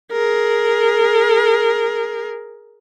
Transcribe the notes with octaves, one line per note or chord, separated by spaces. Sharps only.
G#4 A#4